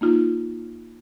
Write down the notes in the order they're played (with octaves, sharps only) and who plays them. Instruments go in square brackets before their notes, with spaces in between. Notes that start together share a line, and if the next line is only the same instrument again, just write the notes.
[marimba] A#3 D#4 F4